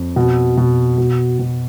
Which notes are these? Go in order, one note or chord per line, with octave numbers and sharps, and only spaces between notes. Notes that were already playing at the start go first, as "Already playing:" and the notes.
Already playing: F2
B2
B2
B2
B2